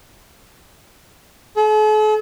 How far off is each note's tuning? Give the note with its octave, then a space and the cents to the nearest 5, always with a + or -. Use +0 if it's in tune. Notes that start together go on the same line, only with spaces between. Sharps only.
A4 -45